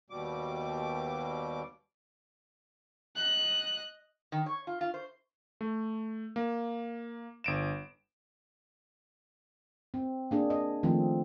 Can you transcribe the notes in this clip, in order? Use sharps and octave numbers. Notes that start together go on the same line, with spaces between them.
D#2 B2 G3 D6
D#5 F#6
D#3
C#5
F4
F4
C5
A3
A#3
G1 D7 E7
C4
A#3 D4 G#4
D#5
D#3 F3 A3 C4